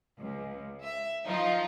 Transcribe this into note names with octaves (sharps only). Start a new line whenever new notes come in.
C#2
E5
F3 D#4 F4